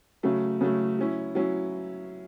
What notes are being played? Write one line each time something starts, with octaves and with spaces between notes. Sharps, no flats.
C#3 F#3 A3
C#3 F#3 A3
F#3 C#4 E4
F#3 C#4 E4